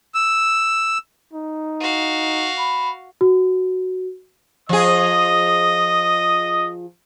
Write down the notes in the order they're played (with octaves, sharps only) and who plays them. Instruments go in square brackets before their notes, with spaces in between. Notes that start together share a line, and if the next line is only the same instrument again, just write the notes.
[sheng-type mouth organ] E6
[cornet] D#4
[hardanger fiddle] F#4 F5
[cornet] B5
[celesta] F#4
[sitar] F3 G#4 [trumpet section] D#5 D#6